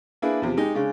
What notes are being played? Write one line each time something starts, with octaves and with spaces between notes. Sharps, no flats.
A#3 D4 E4 G#4 B4
E2 C3 F3
G#3 D#4 G4
C#3 G#3 D4